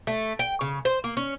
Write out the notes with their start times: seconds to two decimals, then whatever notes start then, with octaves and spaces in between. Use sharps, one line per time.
0.07 A3
0.39 G5
0.61 C#3
0.85 C5
1.04 A#3
1.17 C#4